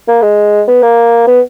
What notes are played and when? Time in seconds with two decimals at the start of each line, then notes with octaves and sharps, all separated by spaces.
0.08 A#3
0.22 G#3
0.68 B3
0.83 A#3
1.27 B3